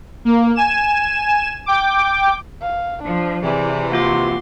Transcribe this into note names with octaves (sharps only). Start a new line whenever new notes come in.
A#3
G#5 E7
G5 D6
F5
F3 D4
C3 E3 G#4 D5
A#3 F4 F#4 C6 D6